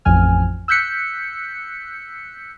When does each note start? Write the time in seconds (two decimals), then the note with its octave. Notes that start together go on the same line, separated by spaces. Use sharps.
0.05 A1 F2 F3 G#5 F6
0.68 E6 F#6 G6 B6 C#7